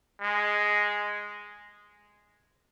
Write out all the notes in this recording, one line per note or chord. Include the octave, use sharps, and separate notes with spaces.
G#3